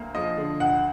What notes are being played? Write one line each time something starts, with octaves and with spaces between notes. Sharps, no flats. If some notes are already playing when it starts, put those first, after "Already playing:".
Already playing: D2 A#3
F3 D#5
D3
D2 F#5